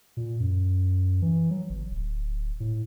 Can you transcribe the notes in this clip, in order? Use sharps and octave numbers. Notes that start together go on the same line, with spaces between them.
A#2
F#2
E3
F#3
G1
D1
A2